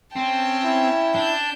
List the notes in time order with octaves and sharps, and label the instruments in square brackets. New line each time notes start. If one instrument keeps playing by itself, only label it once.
[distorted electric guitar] C4 [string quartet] C#4 G5 A5
[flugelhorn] E4
[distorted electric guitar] D4 [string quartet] G6